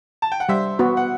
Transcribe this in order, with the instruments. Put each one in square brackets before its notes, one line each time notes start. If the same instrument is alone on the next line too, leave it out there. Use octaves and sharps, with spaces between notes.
[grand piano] A5
G5
F#5
[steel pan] G3 [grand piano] C5 E5
[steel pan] B3 F#4
[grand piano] F#5